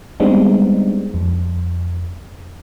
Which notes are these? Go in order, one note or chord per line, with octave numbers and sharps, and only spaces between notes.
G3 G#3 B3 C4 D4 D#4
F2